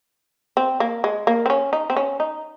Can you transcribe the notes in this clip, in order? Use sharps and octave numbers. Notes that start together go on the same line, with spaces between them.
C4
A#3
G#3
A#3
C4
C#4
D#4
C4
C#4
D#4